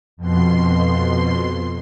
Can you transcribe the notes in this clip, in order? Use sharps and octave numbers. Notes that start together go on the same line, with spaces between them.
F2 B2 C6